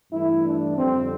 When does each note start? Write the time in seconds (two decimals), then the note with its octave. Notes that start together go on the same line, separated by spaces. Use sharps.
0.11 G2 E3 A3 E4
0.44 D4
0.76 F2 D3 G3 C4